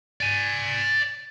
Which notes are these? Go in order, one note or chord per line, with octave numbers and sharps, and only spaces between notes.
D5 G#5